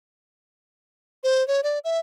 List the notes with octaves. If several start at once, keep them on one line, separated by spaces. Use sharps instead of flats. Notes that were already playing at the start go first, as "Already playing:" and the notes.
C5
C#5
D5
E5